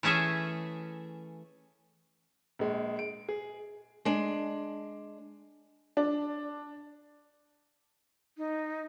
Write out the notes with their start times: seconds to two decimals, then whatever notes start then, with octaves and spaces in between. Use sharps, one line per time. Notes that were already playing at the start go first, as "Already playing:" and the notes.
0.03 E3 A3 C#4 G#4 E5
2.59 A#1 G#3
2.99 D7
3.29 G#4
4.05 G#3 D4
5.97 D4
8.38 D#4